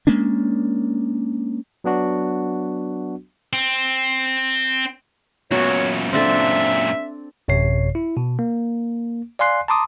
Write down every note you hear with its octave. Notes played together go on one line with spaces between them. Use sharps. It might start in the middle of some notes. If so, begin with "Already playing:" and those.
G#3 A#3 C#4 D4
F#3 B3 D4 F#4
C4
F#2 A#2 B3 F#4 C#5
C4 D4 A4 E5
A1 F#2 C3 C#5 C7
E4
B2
A#3
D5 F5 G#5 C6 F#6 C7
A5 A#5 C6 D6 D#6